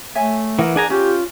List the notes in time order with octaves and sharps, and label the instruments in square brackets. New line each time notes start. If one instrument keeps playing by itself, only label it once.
[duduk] A3 [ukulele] C#5 E5 G#5
[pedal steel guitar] E3 [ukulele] A#4 D#5 F#5
[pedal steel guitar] D4 G#5 A#5 [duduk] G#4
[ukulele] C#4 [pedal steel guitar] F4 [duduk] G4